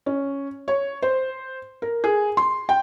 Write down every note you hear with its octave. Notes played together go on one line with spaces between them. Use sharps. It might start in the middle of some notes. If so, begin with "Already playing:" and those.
C#4
C#5
C5
A#4
G#4
C6
G5